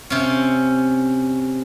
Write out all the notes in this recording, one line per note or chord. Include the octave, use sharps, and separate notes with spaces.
C3 C#4